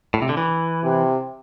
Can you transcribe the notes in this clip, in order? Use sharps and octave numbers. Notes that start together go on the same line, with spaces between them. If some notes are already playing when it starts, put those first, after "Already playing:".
A2
C3
D3
E3
C3